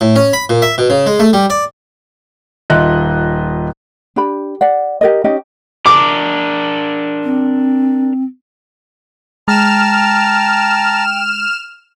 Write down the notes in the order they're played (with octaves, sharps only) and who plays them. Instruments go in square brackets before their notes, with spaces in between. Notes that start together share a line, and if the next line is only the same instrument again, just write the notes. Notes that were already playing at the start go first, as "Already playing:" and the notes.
[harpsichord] A2
C#4
B5
A#2
E5
B2
C#3
G#3
A3
G3
D5
[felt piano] D#1 F4 D#5 E5 F#6
[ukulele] D4 G4 B5
D5 F#5
G4 A#4 D#5
C#4 D#4 G4 D#5
[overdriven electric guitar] D4 A#4 [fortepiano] D6
[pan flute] C4
[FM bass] G#3 [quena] G5 [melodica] A5 A#5 [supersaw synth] F6 E7